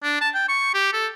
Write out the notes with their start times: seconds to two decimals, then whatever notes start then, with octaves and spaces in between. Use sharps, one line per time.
0.03 D4
0.21 A5
0.34 G5
0.49 C#6
0.74 G4
0.93 A4